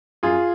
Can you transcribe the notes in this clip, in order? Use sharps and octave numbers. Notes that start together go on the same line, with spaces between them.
F#2 F4 G#4